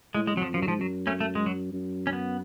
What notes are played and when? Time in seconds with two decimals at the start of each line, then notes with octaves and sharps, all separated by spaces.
0.15 A2 G#3
0.27 G#3
0.35 F2 F#3
0.42 F3
0.54 F#2 F3
0.62 F#3
0.68 G#2 F3
0.80 F#2 F#3
1.07 A3 C#4
1.20 A3
1.35 G#3
1.46 F#3
1.73 F#2
2.07 C#4
2.13 B3